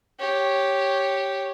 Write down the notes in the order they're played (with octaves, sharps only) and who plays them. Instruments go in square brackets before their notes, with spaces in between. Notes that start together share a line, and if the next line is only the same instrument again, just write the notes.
[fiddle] G4 C#5